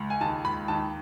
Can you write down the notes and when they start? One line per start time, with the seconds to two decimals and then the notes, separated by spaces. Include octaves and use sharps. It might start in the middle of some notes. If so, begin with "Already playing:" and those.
Already playing: C#2
0.10 G#5
0.21 D#2 A5
0.45 B5
0.68 D#2 A5